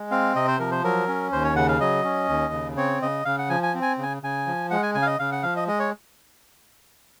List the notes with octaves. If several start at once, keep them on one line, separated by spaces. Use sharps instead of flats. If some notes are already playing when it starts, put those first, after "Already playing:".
Already playing: G#3
C4 F5
C3 D#5
C5
F3 A#4
C5
F#3 A#4
C#4
D#2 C5
C#5
C#3 F#5
F5
F#3 D#5
C#4
D#2
C#3
C4 C#5
C#3 D#5
C#3 F5
F#5
F3 G#5
G#5
C4
G#5
C#3 G#5
C#3 G#5
F3
G#3 F#5
G#5
C#3 G#5
F5
D#5
C#3 F5
F#5
F3 F5
D#5
G#3 D#5
C#5